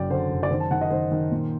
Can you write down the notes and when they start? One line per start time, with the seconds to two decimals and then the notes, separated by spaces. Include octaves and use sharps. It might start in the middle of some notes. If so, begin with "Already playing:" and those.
Already playing: F#1 F#2 D5 G5
0.10 D3 C5
0.30 F#1
0.43 D5
0.51 D#3 C5
0.60 A5
0.71 D#3 F#5
0.81 D#5
0.91 D#3 C5
1.12 D#3
1.31 A#2